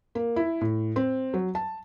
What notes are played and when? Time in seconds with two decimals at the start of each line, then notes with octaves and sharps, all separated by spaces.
0.15 A#3
0.36 E4
0.61 A2
0.96 C4
1.34 F#3
1.55 A5